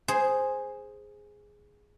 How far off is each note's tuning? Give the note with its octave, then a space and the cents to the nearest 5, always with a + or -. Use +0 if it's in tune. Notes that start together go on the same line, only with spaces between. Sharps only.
G#4 +0 C5 +0